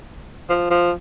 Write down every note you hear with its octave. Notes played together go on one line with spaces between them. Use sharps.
F3
F3